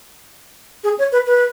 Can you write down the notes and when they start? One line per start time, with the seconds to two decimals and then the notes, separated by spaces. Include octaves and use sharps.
0.84 G#4
0.98 C#5
1.12 B4
1.27 B4